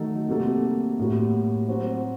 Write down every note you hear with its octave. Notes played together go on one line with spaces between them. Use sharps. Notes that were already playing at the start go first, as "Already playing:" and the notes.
Already playing: D#3 F#3 A3 D#4 A4
C3 G3 A#3 F#4 A4
A2 G3 A#3 F#4
F#3 C4 F#4 C5